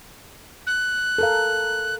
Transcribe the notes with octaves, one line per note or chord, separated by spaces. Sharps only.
F#6
A4 A#4 F5